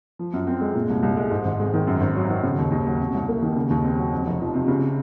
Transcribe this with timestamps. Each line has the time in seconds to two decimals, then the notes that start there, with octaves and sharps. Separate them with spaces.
0.19 F3
0.33 F#2
0.47 C4
0.61 G#3
0.75 A#2
0.90 C2
1.03 C2
1.17 G#3
1.31 G#2
1.45 G#1
1.59 G#3
1.74 D#3
1.87 F#2
2.01 G#1
2.16 F#3
2.29 D#3
2.43 C#3
2.58 D#2
2.71 D#2
2.86 F#3
3.00 C3
3.14 C2
3.28 A#3
3.42 D#3
3.56 C#3
3.70 D#2
3.84 C4
3.98 F#3
4.13 F2
4.26 F1
4.40 F3
4.54 C3
4.68 C#3